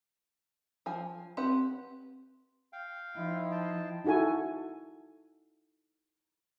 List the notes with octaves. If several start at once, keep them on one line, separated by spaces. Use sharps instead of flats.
F3 G#5
C4 G4 B4 F#5
F5 G5
F3 D#4 E4
G5 A5
D#4 E4 F#4 A4 G#5